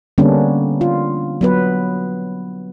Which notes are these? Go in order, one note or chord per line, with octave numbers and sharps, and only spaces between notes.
D3 G3 A#3 B3 C#4 D4
F4
F#3 B3 B4